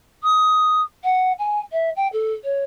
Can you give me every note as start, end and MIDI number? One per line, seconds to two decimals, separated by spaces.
0.23 0.81 87
1.04 1.32 78
1.39 1.59 80
1.72 1.90 76
1.96 2.08 79
2.13 2.33 69
2.44 2.64 73